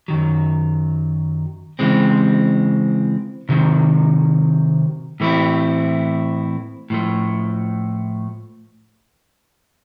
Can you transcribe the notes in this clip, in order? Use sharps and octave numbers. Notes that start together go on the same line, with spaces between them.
F#2 D#3 F#3
C#3 E3 G#3 C4
C3 D#3 F#3
A2 E3 A3 C4 E4
A2 F3 A3